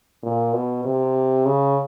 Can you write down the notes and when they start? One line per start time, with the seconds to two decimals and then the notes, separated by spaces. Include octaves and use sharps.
0.23 A#2
0.53 B2
0.85 C3
1.45 C#3